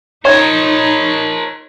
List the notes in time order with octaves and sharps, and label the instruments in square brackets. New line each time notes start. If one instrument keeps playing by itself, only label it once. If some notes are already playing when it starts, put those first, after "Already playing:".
[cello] D#4 [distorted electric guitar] A#4 C5 [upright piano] C#5 G#6